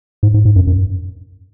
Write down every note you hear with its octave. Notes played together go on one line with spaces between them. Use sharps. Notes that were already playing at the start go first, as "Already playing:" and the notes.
G#2
G#2
G#2
F#2
F#2